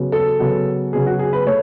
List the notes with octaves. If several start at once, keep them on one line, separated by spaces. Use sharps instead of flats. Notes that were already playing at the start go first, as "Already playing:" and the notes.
Already playing: C#3 F#3 B3
A4
C#3 F#3 B3
C#3 F#3 B3 G#4
F#4
G#4
B4
A3 C#5